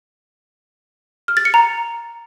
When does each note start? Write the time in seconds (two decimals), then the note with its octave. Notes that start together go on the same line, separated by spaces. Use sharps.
1.28 F6
1.37 A6
1.45 C#7
1.54 A#5